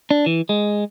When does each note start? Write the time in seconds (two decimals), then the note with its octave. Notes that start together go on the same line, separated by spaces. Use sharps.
0.11 D4
0.26 E3
0.49 G#3